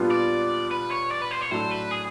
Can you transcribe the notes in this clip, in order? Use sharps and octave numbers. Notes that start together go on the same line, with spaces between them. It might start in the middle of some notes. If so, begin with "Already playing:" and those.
Already playing: A#2 G3 B3 D4 F4
D5
B4
C#5
D5
B4
C5
C#5
A2 F#3 A3 D4 C5
B4
G#4